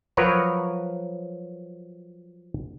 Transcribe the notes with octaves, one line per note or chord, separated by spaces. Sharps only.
F3 F#3 F#4 A#4 B4 C#5